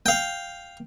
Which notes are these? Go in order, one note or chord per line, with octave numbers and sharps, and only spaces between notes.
F5 G5